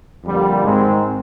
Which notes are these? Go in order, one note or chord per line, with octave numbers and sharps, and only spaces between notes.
F2 D3 G3 A#3
G#2 D#3 G#3 C4